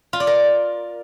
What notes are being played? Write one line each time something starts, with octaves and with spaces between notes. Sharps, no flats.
F4
D5
A#4